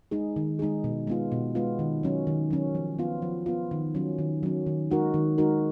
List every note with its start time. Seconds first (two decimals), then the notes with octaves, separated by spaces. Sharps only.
0.11 G#3 D#4 G#4
0.36 D#3
0.59 G#3 D#4 G#4
0.84 B2
1.07 G#3 B3 F4
1.32 B2
1.55 G#3 B3 F4
1.79 D#3
2.03 F#3 C#4
2.27 D#3
2.51 F#3 C#4
2.75 F3
2.99 B3 F4
3.22 F3
3.46 B3 F4
3.71 D#3
3.95 F#3 C#4
4.18 D#3
4.43 F#3 C#4
4.66 D#3
4.91 G#3 D#4 F#4 A#4
5.14 D#3
5.38 G#3 D#4 F#4 A#4